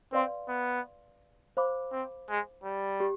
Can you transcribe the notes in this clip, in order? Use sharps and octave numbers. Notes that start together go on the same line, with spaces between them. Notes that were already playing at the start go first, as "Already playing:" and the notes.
C4 B4 D5 F5 C6
B3
C5 F5 B5 D6
C4
G#3
G3
G4